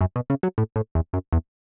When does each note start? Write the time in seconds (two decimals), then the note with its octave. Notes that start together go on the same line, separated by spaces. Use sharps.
0.01 F#2
0.16 B2
0.30 C#3
0.43 F#3
0.58 A2
0.76 A2
0.95 E2
1.13 F#2
1.33 E2